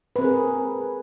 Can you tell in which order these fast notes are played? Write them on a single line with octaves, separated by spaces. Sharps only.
B4 C4 A#4 G#4